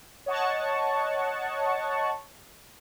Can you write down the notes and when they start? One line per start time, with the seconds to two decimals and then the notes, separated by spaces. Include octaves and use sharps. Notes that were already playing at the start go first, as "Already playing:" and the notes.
0.26 C#5 D#5 F#5 A5 C#6